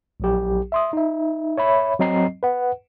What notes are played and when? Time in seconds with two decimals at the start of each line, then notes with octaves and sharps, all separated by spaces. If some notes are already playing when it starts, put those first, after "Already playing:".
0.20 A#1 F#3 G4
0.72 E5 C6 D#6
0.93 D#4 E5
1.58 C#5 E5 B5
2.00 F#3 C4 D#5 A#5 C7
2.43 B4 F#5